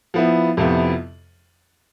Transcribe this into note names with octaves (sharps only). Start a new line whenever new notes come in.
F3 B3 E4
F2 C3 F3 B3 E4